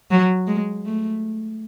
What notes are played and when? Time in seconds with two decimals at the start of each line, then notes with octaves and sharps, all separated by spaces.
0.11 F#3
0.47 G#3
0.86 A3